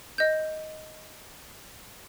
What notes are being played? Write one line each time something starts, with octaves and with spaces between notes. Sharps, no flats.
D#5 G6